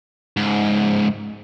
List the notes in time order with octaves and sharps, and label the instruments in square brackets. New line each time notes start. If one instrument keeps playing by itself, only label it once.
[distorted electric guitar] C#2 G#2